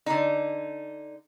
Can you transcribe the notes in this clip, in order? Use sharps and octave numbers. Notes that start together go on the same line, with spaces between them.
D3 D#4